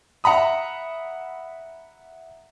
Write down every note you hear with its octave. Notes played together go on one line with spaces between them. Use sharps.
E5 F#5 A#5 B5 D#6